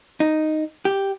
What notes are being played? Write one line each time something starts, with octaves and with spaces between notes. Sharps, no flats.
D#4
G4